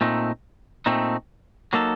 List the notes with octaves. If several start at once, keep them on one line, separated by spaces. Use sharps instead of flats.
A#2 A3 C4 D#4
A#2 A3 C4 D#4
F#3 A#3 D#4 A4